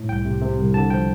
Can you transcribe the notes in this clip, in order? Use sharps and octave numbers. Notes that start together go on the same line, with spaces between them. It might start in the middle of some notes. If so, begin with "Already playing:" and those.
Already playing: A2
C2 G5
C3
C3
C2
D3 A5
F3 G5